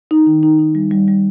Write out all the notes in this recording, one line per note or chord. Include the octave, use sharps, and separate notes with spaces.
D#4
D#3
D#4
D#4
G3
G3
G3